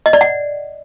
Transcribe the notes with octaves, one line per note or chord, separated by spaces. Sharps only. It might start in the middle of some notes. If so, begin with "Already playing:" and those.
D#5
D5
F#5